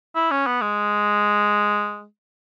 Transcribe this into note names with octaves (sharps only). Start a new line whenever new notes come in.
E4
C#4
B3
G#3